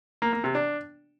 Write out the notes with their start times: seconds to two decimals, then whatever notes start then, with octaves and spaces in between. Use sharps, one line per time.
0.22 A#3
0.33 A#3
0.44 C3
0.55 D4